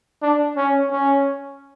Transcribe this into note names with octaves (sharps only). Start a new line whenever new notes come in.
D4
C#4
C#4